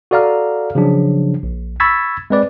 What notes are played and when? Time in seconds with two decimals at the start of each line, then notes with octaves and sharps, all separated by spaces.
0.11 F#4 A4 D5 F5 A#5 F6
0.75 C#3 F3 F#3 D4
1.43 A#1
1.80 B5 C#6 E6 G#6 A6 B6
2.30 G#3 C4 B4 D5